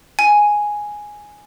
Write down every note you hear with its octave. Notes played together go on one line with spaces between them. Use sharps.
G#5